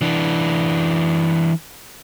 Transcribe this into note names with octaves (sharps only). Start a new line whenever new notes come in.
E3 D4